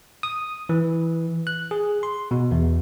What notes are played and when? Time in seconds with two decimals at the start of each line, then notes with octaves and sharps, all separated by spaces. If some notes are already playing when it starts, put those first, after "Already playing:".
0.23 D#6
0.69 E3
1.47 F#6
1.71 G#4
2.03 C6
2.31 B2
2.51 E2